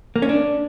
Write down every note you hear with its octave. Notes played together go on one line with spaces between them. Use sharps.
A#3
C#4
D4